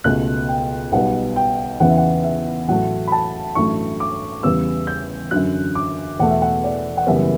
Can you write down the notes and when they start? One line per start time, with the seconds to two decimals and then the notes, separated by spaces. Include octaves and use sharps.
0.04 C#2 B2 A3 F#6
0.48 G5
0.92 B1 B2 G3 B3 F#5
1.36 G5
1.80 E2 C#3 E3 B3 F#5
1.89 E5
1.98 F#5
2.24 E5
2.68 A1 A2 F#3 A3 F#5
3.08 B5
3.12 A5
3.55 A1 G2 F#3 A3 C#6
4.00 D6
4.43 E2 C#3 G3 B3 E6
4.87 G6
5.31 F#2 D3 F#3 F#6
5.75 D6
6.19 E2 B2 A3 F#5
6.31 E5
6.42 F#5
6.64 D5
6.97 F#5
7.07 F#1 F#2 E3 G3 B3 E5